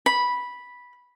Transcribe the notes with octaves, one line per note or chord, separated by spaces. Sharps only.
B5